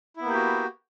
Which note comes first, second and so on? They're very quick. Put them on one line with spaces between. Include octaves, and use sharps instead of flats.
E4 B3 A#3 G4 F#4